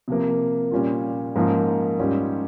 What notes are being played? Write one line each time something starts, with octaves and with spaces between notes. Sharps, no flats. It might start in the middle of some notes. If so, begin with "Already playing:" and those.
C3 F3 A#3
A#2 G3 C#4 F4
G#2 F3 A#3 C#4 F4
G#2 G3 C#4 F4